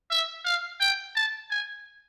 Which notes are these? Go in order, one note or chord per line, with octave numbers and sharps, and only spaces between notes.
E5
F5
G5
A5
G#5